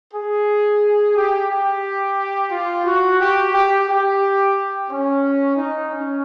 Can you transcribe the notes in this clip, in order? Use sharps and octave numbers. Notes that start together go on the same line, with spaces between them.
G#4
G4
G4
F4
F#4
G4
G4
G4
C#4
D#4
C#4